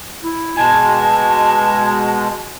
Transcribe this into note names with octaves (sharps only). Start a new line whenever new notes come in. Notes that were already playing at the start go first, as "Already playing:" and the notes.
E4
B2 G#3 G#5 A5